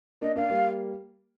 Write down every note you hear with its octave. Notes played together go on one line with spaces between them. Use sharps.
A#3 D4 D#5
A#3 D4 F5
G3 A#3